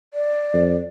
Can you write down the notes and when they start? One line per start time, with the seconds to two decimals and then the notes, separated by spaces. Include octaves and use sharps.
0.14 D5
0.54 F2